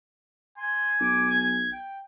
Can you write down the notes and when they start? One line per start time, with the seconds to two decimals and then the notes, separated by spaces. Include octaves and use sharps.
0.58 G#5 C6
1.01 B1 D6
1.30 G#6
1.72 G5